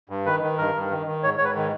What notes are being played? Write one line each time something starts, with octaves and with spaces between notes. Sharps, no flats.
G2
D#3 B4
D#3
G2 A#4
G2
D#3
D#3
G#2 C#5
G#2 C#5
B4
D#3